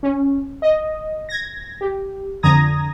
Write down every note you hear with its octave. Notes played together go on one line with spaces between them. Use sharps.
C#4
D#5
G#6 A#6
G4
F2 D3 A#5 D#6 G#6 A#6